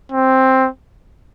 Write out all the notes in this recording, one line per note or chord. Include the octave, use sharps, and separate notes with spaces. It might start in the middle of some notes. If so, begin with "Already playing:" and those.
C4